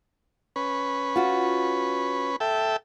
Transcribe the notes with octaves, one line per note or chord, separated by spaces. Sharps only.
C#4 B4
F4 F#4
A4 E5 G5